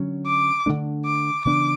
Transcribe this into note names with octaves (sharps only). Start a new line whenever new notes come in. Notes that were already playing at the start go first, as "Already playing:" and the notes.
Already playing: D3 F#3 C#4
D6
D3 F#3 A3 D4
D6
C#3 E3 B3 D4 D6